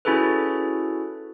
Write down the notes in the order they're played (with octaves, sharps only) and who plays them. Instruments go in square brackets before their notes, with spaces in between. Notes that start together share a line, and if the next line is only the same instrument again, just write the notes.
[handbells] C#4 E4 F#4 G#4 A4 B4